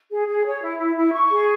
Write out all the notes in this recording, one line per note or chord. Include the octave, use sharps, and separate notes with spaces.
G#4
G#4
C#5
E4
E4
E4
C#6
G#4